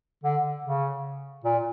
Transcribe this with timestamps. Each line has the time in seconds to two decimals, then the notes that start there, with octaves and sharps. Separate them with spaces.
0.24 D3
0.64 C#3
1.44 A#2